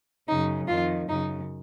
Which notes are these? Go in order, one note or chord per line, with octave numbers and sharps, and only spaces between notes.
F#2 C#3 D#4
F2 D#3 F4
F#2 C#3 D#4